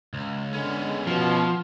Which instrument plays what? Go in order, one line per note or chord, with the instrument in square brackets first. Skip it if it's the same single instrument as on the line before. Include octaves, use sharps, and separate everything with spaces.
[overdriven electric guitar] C#2
[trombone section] D3 G#3 [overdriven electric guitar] B3 C#4
[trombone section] B2 [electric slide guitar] F3